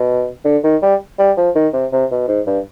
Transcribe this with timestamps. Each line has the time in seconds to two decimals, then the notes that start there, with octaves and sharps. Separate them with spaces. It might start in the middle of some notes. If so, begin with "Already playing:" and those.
Already playing: B2
0.45 D3
0.64 D#3
0.82 G3
1.19 G3
1.37 F3
1.55 D#3
1.73 C3
1.93 C3
2.11 B2
2.28 G#2
2.47 G2